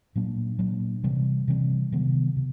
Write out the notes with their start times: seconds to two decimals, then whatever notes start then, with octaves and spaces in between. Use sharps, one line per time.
0.16 A#2 F#3 A#3 D4
0.59 A#2 F#3 A#3 D4
1.04 C3 E3 G3 C4
1.48 C3 E3 G3 C4
1.92 C3 D#3 F#3 B3
2.36 C3